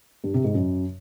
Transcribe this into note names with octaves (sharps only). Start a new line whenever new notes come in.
G2
C3
G#2
F#2